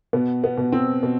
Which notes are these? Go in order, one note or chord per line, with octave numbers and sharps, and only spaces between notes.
B2 B3
B3
B2
C4
B2